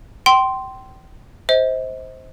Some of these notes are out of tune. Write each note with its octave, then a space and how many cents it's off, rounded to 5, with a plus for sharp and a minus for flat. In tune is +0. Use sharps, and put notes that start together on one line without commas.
G5 -30 C6 +0
C5 +0 D#5 +40